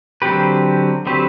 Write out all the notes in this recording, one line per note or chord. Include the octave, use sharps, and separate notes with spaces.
D3 F#3 C4 G4 B4
D3 F#3 C4 G4 B4